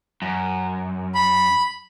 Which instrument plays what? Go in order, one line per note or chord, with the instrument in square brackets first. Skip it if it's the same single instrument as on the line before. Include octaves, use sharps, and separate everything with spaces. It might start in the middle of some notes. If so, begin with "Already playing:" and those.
[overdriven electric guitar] F#2
[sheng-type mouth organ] B5